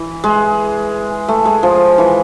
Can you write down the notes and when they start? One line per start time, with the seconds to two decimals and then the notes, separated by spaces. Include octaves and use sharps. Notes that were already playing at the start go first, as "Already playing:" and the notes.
Already playing: E3
0.24 G#3
1.28 A3
1.45 G#3
1.63 F3
1.98 E3